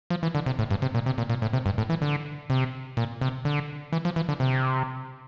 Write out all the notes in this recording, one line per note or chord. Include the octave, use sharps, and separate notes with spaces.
F3
E3
D3
C3
A2
G2
C3
A#2
C3
A#2
A#2
A2
C3
G2
A2
E3
D3
C3
A#2
C3
D3
E3
F3
E3
D3
C3